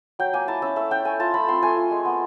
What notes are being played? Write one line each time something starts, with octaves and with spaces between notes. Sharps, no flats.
F#3 G5
A#3 G#5
E4 A5
C#4 E5
A3 E5
C#4 G5
A3 G#5
F4 A5
A3 B5
C4 C6
A3 G#5
F4
G#3
B3